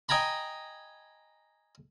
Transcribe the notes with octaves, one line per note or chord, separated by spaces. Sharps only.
D#5 G5 G#5 A#5 B5